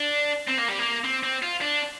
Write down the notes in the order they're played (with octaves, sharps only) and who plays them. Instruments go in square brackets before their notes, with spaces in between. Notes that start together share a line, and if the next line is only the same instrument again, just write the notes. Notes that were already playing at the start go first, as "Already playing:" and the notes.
Already playing: [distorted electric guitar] D4
C4
A#3
G3
A#3
C4
C4
F4
D4